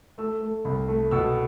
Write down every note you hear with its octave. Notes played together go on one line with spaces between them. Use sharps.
A3 E6
A3
C2
A3
B2 E6